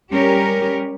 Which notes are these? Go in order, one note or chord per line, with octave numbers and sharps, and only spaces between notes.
G3 C#4 G4 A#4